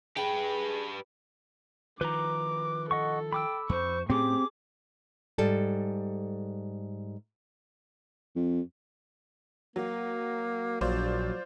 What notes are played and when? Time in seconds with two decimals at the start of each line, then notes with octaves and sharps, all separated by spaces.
0.17 G4 G#4 B4 G5
2.01 D#3 F3 B4 A#5 D6
2.91 A4 D#5 F#5 C#6
3.33 G5 B5 D6 E6
3.69 F2 C5 C#6
4.10 A2 A3 C4 C#4 G4 G#4 D6
5.38 G#2 G3 A4
8.36 F2
9.76 F#3 A#3
10.81 A#1 F#3 F4 C5 D5